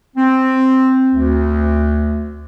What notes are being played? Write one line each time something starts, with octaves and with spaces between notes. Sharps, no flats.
C4
D2